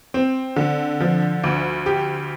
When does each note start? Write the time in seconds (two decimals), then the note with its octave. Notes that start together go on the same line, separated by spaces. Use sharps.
0.14 C4
0.56 D3
1.00 F3
1.44 D2
1.86 G4